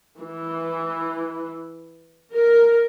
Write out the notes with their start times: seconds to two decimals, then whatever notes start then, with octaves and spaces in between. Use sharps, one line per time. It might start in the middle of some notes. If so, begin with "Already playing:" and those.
0.21 E3
2.34 A#4